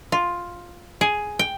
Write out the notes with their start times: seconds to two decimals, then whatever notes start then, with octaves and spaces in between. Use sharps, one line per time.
0.12 F4
1.01 G#4
1.39 G5